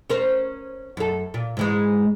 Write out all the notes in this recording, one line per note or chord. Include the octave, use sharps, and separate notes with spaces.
C#4 A#4 C5
F#2 A4
A#2
G#2 E3 G#3